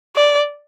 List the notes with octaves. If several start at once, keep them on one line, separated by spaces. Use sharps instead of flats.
D5